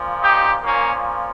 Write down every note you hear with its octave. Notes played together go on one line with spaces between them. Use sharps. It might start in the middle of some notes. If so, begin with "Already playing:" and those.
Already playing: A#2 F3
D#4 G4
A#2 F3 A#3 C#4